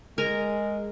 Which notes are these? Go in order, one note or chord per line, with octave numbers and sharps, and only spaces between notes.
G#3 A#4 G#5 A#5